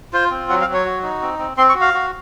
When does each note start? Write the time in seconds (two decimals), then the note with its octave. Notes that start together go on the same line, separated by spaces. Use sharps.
0.13 F4 C5
0.31 C4
0.49 F#3 F#5
0.61 F5
0.67 F#3
0.73 C#5
0.85 F#4
1.03 D#4
1.21 C4
1.39 C4
1.57 C4 C6
1.69 C#6
1.75 F#4
1.81 F5
1.94 F#4